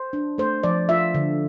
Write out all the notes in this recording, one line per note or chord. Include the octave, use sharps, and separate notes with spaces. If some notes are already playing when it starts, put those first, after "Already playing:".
Already playing: C5
D4
A3 C5
F3 D5
F4 E5
D3